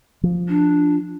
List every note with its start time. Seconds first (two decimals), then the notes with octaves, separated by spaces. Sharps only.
0.23 F3
0.48 D4